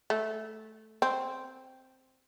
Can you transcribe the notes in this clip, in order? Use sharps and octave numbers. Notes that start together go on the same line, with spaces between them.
A3
C4